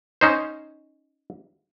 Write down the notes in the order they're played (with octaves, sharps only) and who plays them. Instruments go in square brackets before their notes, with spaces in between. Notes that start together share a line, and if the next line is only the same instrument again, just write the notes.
[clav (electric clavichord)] C#4 D#4 C5